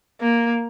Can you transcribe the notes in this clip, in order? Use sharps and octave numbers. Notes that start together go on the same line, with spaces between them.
A#3